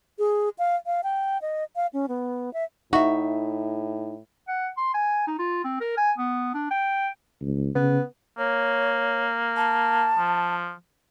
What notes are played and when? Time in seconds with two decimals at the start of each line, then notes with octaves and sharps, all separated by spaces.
0.19 G#4
0.58 F5
0.86 F5
1.04 G5
1.42 D#5
1.76 F5
1.93 C#4
2.08 B3
2.53 E5
2.93 A2 D#4 F#4 E5
4.48 F#5
4.77 C6
4.94 G#5
5.27 D#4
5.39 F4
5.65 C4
5.80 A#4
5.97 G#5
6.18 B3
6.54 D4
6.71 G5
7.41 C#2
7.75 C#3 B3
8.38 A#3 C#5
9.57 A5
10.18 F3